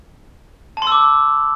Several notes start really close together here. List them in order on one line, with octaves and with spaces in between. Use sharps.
A5 C6 E6 D6